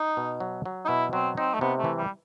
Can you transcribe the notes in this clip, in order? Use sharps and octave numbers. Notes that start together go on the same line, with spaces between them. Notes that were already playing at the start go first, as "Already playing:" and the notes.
Already playing: D#4
B2
F#3
F#3
D#4
B2 E4
F#3 C4
C4 D#4
A3
C3 B3
A3
E3
G3